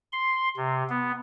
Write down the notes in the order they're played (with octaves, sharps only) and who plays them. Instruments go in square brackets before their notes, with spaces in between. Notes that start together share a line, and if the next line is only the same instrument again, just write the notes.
[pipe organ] C6
C3
B3